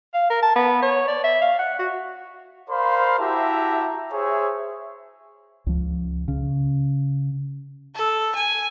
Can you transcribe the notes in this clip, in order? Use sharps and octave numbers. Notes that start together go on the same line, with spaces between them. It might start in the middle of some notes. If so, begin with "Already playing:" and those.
F5
A#4
A5
B3
C#5
D5
E5
F5
F#5
F#4
A#4 C5 D5 F5 B5 C6
E4 F#4 G4 E5 A5 A#5
G#4 C5 C#5 E5
C#2 F3
C#3
A4
G#5